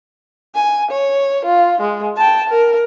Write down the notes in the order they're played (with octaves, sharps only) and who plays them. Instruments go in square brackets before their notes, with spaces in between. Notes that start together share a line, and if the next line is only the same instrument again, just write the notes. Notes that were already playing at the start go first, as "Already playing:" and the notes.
[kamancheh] G#5
C#5
F4
G#3
G5 A5
A#4